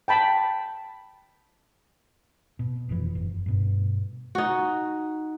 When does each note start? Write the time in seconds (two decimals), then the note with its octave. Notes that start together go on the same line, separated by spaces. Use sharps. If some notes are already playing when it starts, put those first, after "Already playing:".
0.08 G5 A5 B5
2.59 B2
2.89 F1 F2 A#2 E3
3.15 F#1
3.46 G2 B2
4.35 D#4 F#4